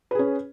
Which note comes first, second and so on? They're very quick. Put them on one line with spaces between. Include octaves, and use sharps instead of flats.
B4 G#4 C#4